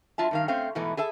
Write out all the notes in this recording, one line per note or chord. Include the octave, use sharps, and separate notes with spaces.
F#3 F4 E5 A5
G2 D#3 F5
A3 C4 C#4 C5 F5 G5
G#2 B2 E3 A3 B3 D#4
G#4 A4 E5 A5